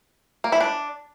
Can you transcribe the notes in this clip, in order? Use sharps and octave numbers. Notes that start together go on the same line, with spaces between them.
A#3
E4
D4